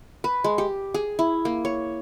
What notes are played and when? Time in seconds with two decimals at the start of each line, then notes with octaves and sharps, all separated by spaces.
0.24 B4
0.44 G#3
0.58 G4
0.94 G#4
1.19 E4
1.45 A#3
1.65 C#5